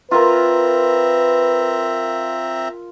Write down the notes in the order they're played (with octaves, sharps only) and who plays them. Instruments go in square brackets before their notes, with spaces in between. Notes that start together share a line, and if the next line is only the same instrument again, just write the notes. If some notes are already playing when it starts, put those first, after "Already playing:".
[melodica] C4 E5 A#5 [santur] F4 A#4 [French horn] B4